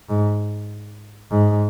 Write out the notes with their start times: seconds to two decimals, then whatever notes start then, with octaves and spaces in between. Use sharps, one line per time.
0.10 G#2
1.30 G#2